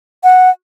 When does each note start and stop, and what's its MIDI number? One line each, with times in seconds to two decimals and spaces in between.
0.24 0.50 78